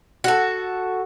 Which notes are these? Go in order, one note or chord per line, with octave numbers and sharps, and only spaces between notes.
F#4 A4